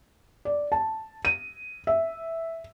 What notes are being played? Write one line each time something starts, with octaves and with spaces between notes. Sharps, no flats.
D5
A5
D#7
E5